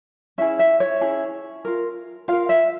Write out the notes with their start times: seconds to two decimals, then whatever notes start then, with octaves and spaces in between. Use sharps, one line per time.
0.38 C#4 E4 G#4 E5
0.59 E5
0.80 C#5
1.01 C#4 E4 G#4
1.65 F4 A#4
2.28 F4 A#4 F5
2.49 E5